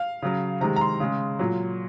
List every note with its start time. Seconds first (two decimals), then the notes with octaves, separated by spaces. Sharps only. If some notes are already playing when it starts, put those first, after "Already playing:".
Already playing: F5
0.22 C#3 F#3
0.61 C3 D#3 G#3 A#5
0.76 A#5
0.81 C6
1.00 C#3 G#3
1.39 A#2 F#3